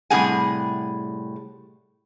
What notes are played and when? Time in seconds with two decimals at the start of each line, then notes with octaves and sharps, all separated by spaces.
0.10 A2 C3 G3 G#4 F#5 G#5